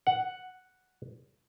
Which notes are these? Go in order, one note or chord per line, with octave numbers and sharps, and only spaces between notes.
F#5